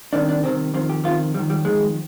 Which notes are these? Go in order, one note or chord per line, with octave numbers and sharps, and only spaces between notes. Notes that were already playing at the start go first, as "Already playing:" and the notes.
C2 C3 D#3 D4
D4
C2 C3 D#3 C4
F2 C3 D#3 C4
G4
F2 C3 D#3 F4
F2 D#3 G3
G3
F2 D#3 G#3